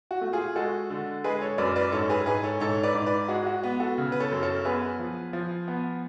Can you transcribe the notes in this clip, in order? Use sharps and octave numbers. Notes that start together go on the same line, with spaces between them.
F#4
A3
F4 G#4
G#3 F#4 A4
D3
G#3 G#4 B4
A4 C#5
F#2 B4 D5
B4 D5
G#2 A4 C#5
G#4 B4
G#2 G#4 B4
A4 C#5
G#2 A4 C#5
B4 D5
G#2
B4 D5
G#3 F#4
F#4
B3
F#4 A4
C#3
B4
A4 C#5
F#2
A4 C#5
B3 G#4 B4
F3
F3
B3